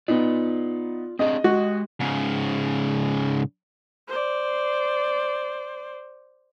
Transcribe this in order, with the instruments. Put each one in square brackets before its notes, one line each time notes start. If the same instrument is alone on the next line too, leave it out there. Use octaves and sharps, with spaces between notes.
[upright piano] B3 D#4 [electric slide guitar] F4 D5
[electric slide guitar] C4 D4 G#4 [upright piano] D#5
[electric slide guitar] G#3 G4 [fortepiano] F#4
[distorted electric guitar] G#2 C#3
[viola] C5 D5